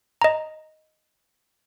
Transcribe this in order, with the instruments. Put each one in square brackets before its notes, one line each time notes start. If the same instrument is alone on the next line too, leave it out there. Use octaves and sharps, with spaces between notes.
[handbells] D#5 A#5